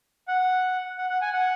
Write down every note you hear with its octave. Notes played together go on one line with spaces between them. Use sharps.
F#5
F#5
F#5
G#5
F#5